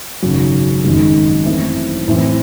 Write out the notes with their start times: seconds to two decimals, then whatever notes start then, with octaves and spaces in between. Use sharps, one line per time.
0.22 G#1 F#2 C#3 F#3
0.84 G#1 F#2 D#3 G#3
1.45 F#2 E3 A3 C4 E4
2.08 A2 E3 C4